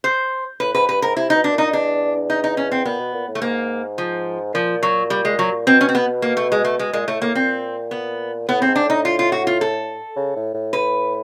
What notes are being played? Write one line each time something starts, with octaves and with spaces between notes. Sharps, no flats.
C5
A2 B4
G#2 B4
G2 B4
G#2 A#4
C3 E4
D#4
B2
D4
A#2 D#4
E2 D4
D#4
D#4
C#4
C4
A#2 B3
B2
A#2
A2
A3
G#2 A#3
F3
A#2 F3
F#3
G3
G#3
F#3
B2 C4
C#4
C4
B3
A#3
A3
G#3
A3
B2 G#3
A#2 G#3
A2 A3
A2 A#3
A#2 C4
B3
A2 B3
C4
G#2
D4
A2 D#4
F4
F4
F#4
F4
A4
C#3
A2
A2
B4